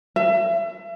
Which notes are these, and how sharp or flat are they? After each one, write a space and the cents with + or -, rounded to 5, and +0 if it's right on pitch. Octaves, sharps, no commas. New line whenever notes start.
E5 +35